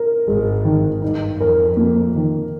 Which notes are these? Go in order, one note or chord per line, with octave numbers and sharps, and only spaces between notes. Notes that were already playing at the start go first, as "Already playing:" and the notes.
Already playing: A#4
G#1 G#2 G#3
D#3
G2 D#4
F2 A#4
A#3
D#3